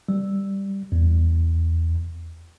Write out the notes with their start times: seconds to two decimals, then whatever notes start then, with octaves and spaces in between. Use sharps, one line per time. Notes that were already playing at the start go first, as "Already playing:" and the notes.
0.09 G3
0.92 E2